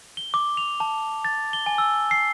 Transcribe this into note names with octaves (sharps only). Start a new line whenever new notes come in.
G7
D6
F7
A5
A6
G7
G#5
E6
C7